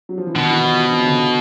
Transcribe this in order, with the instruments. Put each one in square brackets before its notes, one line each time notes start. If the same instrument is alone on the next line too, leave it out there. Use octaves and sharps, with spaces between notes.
[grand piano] F#3
F3
E3
[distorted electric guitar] B2 [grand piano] D#3
[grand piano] E3
F3
F3
D#3
C#3
D3